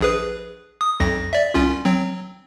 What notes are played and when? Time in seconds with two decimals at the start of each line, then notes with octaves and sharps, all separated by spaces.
0.01 A#1 G#4 B4
0.81 D#6
1.00 B1 F2 A#6
1.33 D5 E5
1.54 C2 C#4 F4
1.85 F#3 C4